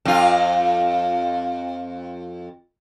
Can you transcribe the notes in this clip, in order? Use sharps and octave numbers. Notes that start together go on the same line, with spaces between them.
F2 F4